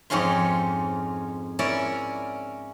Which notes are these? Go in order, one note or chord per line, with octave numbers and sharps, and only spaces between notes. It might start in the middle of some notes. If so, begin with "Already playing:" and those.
F2 G#2 C#4 F4 C6
C#4 E4 A#4 D5